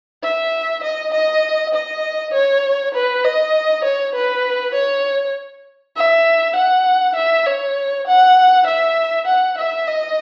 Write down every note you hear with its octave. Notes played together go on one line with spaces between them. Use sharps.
E5
D#5
D#5
D#5
C#5
B4
D#5
C#5
B4
C#5
E5
F#5
E5
C#5
F#5
E5
F#5
E5
D#5